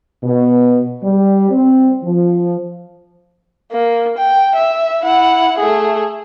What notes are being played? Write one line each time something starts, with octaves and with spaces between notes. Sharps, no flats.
B2
G3
C4
F3
A#3
G5
E5
E4 F#5
A3 G#4